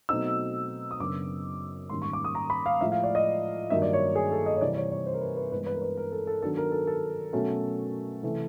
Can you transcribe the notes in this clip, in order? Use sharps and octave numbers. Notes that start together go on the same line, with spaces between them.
B2 F#3 A3 C4 D#4 E6
D#6
F#2 C#3 F#3 B3 D4 D6
G#2 D#3 G3 A#3 C#4 C6
C#6
D6
D#6
A#5
B5
F5
A2 F3 G#3 E5
F5
D5
D#5
G2 D#3 F#3 A#3 D#4 E5
D5
C#5
G#4
A4
D#5
C#5
C3 E3 G3 C4 D5
C#5
C#5
C5
A#4
B4
B4
G2 E3 G#3 B3 B4
B4
A#4
B4
A#4
A4
A4
D#3 F#3 B3 D4 A4
A#4
A4
A4
B2 F#3 A3 C#4
C3 E3 A3